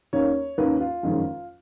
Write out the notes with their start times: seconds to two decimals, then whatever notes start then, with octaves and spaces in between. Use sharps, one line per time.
0.13 D#2 D#3 A#3 C#4 C#5
0.58 D#2 D#3 A#3 C#4 B4
0.81 F4
1.03 F#1 F2 D#3 G#3 C#4